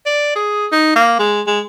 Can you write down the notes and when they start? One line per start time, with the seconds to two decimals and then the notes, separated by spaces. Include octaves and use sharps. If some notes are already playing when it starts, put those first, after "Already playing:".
0.06 D5
0.35 G#4
0.72 D#4
0.96 A#3
1.19 G#3
1.47 G#3